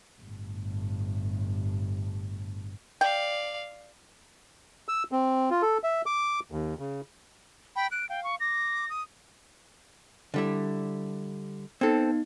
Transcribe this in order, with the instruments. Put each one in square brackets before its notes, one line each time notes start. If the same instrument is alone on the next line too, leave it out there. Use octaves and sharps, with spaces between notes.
[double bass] G1 A2
[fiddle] D5 F5 [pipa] G5
[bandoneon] E6
C4
F4
A4
E5
D6
D#2
C#3
[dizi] G5 [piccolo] B5
[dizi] F#6 [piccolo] D7
[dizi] F5 [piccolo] G5
[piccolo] C#6
[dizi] D6 [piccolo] A#6
[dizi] D#6
[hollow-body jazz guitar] D3 G3 E4
[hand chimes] B3 D#4 [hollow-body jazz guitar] C4 A4